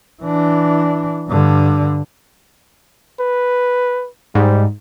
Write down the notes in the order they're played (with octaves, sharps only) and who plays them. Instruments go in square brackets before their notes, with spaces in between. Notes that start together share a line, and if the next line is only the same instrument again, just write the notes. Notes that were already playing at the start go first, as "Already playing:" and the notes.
[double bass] E3 D4
G2 D3
[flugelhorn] B4
[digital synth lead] G#2 [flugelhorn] G3